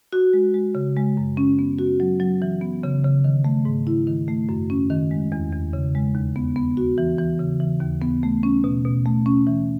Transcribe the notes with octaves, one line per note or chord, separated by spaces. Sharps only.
F#4
G#3
G#3
C#3
G#3
F#2
C#4
B3
F#4
F#3
F#3
E3
B3
C#3
C#3
D#3
A3
G#2
E4
D#3
A3
F#2
C#4
D#3
G#3
E2
E2
C#3
G#3
D#2
B3
B3
F#4
E3
E3
C#3
E3
D#2
B3
A3
C#4
B2
B2
A3
C#4
E3